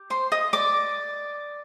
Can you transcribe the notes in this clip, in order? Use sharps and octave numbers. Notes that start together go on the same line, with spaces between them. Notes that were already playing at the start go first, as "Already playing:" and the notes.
Already playing: G4
C5 C6
D#5 D#6
D5 D6